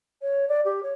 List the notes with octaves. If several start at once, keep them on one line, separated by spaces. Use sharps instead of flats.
C#5
D5
G4
C#5